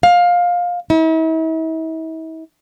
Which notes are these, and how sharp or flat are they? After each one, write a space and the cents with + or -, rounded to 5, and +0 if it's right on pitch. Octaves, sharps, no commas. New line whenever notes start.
F5 +15
E4 -45